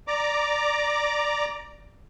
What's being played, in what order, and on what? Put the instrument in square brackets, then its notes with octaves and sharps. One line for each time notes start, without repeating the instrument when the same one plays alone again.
[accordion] D5 A#5 D6